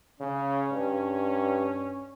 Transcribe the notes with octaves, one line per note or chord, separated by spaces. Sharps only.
C#3 C#4
G2